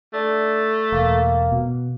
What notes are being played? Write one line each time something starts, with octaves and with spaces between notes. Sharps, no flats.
A3 D4
E1 A#3
B2